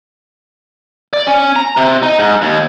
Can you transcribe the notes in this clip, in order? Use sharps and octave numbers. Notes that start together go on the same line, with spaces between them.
D5
C#4
A#5
C3
D#4
G#2
D#2